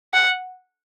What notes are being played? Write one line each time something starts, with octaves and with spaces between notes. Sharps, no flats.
F#5